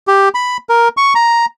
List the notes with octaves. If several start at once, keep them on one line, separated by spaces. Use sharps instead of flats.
G4
B5
A#4
C#6
A#5